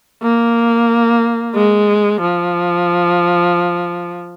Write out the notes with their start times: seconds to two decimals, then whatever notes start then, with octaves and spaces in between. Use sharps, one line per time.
0.23 A#3
1.55 G#3
2.22 F3